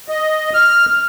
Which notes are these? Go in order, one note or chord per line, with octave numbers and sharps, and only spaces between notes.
D#5
F6